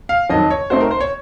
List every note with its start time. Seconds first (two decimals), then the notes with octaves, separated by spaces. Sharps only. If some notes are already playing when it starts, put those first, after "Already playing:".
0.09 F5
0.30 F2 D#3 F#3 D#5
0.51 C#5
0.70 A3 C4 D#4 F#4 C5
0.81 A#4
0.91 C5
1.00 C#5